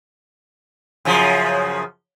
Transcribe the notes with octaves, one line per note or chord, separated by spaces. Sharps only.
F#2 C#3 F3